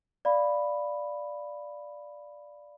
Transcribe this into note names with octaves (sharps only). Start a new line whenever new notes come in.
D5 F5 B5